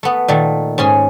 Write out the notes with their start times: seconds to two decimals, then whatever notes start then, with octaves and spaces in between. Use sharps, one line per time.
0.03 A3 B3
0.28 A#2 D#3 A3
0.78 G#2 C#4 G#5 C6